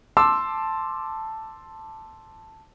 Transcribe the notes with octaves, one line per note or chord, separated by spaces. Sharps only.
A5 C6 D6 E6